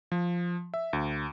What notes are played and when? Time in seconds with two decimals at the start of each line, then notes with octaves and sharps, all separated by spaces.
0.12 F3
0.74 E5
0.93 D2